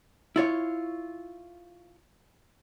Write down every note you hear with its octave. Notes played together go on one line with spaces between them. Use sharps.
E4 F4 C#5